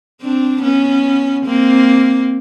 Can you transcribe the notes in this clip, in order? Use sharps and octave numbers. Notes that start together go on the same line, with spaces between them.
C4 D4
B3 C#4
A#3 C4